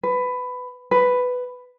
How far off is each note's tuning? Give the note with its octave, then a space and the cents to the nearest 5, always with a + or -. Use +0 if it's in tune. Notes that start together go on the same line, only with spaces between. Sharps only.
B4 +15
B4 +10